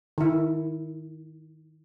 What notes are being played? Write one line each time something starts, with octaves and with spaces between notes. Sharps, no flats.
D#3 E4